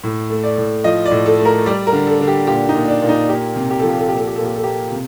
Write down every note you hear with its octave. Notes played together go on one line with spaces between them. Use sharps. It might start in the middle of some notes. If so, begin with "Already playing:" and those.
A2
A3
D5
A2
F3 D#5
D5
A2
A4
A3
A#4
G3 D5
A#4
D3
A4
D3
G4
A#2 G4
D#4
A#2
D4
A#2
D#4
A#3 G4
C3
G4
F3 A4
G4
A4
A#2 G4
A4
G4
A#2 A4
G4
A4
A#3 G4
C3